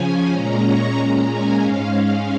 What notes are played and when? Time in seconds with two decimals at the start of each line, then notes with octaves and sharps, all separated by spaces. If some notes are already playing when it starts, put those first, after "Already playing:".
Already playing: C#3 F3 C#4 G#5
0.32 A#2 G#3 C#4 A#5
0.64 C#6
0.96 A#2 G#3 C#4 A#5
1.29 G#5
1.61 G#2 G#3 C#4 F5
1.92 F5